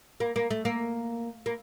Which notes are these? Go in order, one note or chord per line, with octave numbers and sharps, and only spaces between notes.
A#3
A#3
A3
A#3
A#3